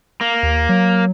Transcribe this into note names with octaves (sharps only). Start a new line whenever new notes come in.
A#3
D#2
F#3